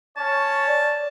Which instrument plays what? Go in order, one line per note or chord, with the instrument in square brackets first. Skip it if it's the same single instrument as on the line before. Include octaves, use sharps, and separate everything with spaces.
[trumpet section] C#4 C#5 [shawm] A5
[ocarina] D5